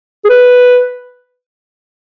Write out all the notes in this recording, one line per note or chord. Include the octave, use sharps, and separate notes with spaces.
G#4
B4